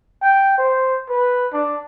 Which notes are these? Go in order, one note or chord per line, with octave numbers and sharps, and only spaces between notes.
G5
C5
B4
D4